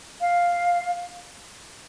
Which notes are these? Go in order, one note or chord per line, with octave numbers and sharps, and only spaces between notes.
F5